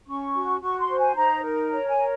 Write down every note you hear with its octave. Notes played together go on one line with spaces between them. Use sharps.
C#4 C#6
F#4
F#4 C#6
C6
C5
G#5
D#4 A#5
A#4
C#5 A#5
G#5
A#4